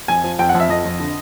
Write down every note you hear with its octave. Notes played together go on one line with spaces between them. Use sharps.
F2 G#5
F3
F2 G5
F#5
F2
E5
F2 D#5
F2
D3